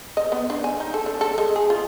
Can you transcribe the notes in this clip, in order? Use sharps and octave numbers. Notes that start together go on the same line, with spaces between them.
D#5
B3
D4
G#5
D#4
A4
D4
A4
G#3
G#4
F4